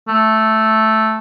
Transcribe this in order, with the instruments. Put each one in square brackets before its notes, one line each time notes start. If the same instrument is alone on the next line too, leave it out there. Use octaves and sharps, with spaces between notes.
[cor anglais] A3